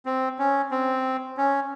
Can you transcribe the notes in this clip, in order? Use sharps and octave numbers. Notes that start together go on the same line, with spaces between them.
C4
C#4
C4
C#4